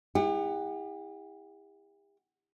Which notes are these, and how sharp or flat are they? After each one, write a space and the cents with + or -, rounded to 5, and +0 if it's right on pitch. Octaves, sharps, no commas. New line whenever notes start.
E4 -20 G4 +45 F#5 +10